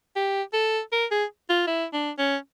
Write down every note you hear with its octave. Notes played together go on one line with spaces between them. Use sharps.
G4
A4
A#4
G#4
F4
E4
D4
C#4